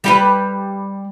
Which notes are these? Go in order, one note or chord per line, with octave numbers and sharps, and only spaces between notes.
G3 G4 B4